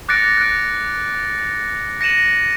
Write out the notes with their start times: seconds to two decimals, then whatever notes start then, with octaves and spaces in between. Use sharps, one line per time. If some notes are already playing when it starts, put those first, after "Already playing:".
0.09 D6 F#6 A6 A#6 C#7 D7
0.38 F#6 D7
2.01 A#6 C#7 D#7 E7 F#7